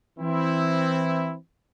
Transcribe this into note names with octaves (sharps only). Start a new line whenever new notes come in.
E3 C4 E4